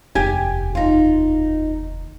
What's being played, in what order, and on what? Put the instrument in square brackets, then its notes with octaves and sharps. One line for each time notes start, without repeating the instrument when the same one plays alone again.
[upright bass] F1 D#2 [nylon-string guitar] G4 G#5
[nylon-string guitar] D#4 F4